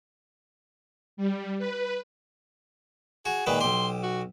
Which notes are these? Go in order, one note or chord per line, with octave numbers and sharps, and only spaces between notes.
G3
B4
F#4 G#4
A#2 D#3 G#3 B4
B1 G4 C6
F#4